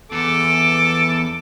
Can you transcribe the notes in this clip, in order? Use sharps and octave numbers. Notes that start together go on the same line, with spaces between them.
E2 A4 D6